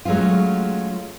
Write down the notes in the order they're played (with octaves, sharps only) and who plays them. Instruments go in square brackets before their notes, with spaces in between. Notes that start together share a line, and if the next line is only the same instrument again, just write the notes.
[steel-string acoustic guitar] F#3 G#3 A3 C#4 F4